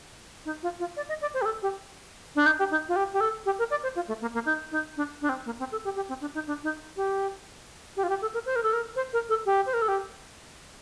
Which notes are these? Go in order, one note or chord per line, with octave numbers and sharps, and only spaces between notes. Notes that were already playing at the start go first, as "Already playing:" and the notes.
D#4
F4
F4
D5
D#5
D5
C5
G4
A4
G4
D4
D#4
G4
D#4
F4
G4
G4
A4
G4
A#4
D5
C5
F4
A3
A#3
A#3
D#4
D#4
D4
D4
C4
A#3
C4
A4
G4
G4
C4
D4
D#4
D4
D#4
G4
G4
F4
G4
A4
A#4
C5
A#4
A4
A#4
C5
A#4
A4
G4
C5
A#4
A4
G4